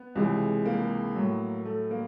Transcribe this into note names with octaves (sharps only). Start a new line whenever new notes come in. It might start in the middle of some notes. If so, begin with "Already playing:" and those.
Already playing: B3
C#2 C3 E3 G#3
A#3
A2 F#3
A3
A#3